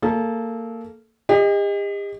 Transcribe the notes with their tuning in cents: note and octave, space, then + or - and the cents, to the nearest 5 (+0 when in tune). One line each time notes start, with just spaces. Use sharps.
A#3 -25 A4 -25
G4 +45 D#5 +0